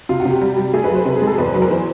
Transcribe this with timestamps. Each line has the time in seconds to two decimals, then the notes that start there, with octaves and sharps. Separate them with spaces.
0.09 C3 F4
0.20 F#4
0.25 C3
0.31 G4
0.42 G3
0.58 G3
0.73 A3 G#4
0.84 B4
0.90 F#3
0.95 C5
1.06 C3 B4
1.16 G#4
1.22 G#3
1.27 A4
1.38 E2 B4
1.46 C5
1.54 F#3 B4
1.62 A#4
1.70 E3 C5